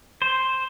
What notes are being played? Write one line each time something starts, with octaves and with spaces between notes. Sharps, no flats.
C5